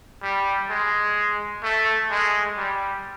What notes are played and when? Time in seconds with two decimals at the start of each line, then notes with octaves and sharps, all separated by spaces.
0.23 G3
0.69 G#3
1.63 A3
2.11 G#3
2.57 G3